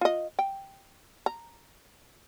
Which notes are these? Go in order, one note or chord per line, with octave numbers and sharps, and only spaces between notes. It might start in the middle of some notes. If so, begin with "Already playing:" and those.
F4 D#5
G5
A#5